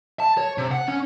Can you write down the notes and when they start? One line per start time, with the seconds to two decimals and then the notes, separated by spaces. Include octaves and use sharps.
0.20 A5
0.37 C#5
0.58 C3
0.71 F#5
0.88 C#4